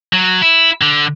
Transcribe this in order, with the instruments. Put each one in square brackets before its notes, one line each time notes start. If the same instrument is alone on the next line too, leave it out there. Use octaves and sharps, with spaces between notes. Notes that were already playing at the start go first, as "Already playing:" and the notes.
[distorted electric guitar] F#3
E4
D3